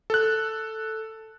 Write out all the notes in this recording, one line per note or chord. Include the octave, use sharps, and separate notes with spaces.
A4 F#6